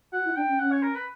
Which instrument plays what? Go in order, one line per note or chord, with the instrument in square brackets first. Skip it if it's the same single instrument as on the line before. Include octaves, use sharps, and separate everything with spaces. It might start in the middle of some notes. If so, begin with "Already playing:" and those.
[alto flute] F#4 [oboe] F#5
[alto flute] E4
[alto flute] D4 [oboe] G5
[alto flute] C#4
[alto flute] C#4 [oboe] F#5
[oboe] C#5
A#4
B4